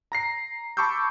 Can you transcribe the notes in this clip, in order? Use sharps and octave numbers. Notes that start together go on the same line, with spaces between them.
A#5 A#6 C7
A5 B5 C#6 D6 E6 G6